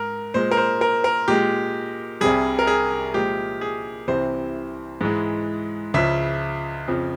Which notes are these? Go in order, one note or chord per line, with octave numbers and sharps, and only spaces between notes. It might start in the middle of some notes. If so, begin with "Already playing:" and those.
Already playing: G#2 A#4
A#2 G#3 C5
A#4
C5
A#4
A#4
A#2 G#3 G4
C2 C3 G3 G#4
A#4
G#4
A#2 F3 G#3 G4
G#4
C2 C3 E3 C5
G#2 E3 G#3
C#2 C#3 F3 E5
F2 C#3 F3